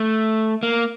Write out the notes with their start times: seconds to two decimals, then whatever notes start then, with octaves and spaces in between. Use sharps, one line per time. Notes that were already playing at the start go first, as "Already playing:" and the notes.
Already playing: A3
0.63 A#3